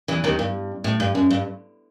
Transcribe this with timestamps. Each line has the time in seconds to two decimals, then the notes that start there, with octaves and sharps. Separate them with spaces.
0.08 E2 E3
0.24 D#2 D#3
0.39 G2
0.84 A2
1.00 G2
1.15 F#2
1.31 G2